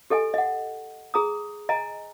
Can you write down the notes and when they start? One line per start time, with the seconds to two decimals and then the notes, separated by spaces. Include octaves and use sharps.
0.10 G4 A4 D#5 G#5
0.34 D#5 F#5
1.14 G#4 A#5 D#6
1.69 D#5 G#5 A#5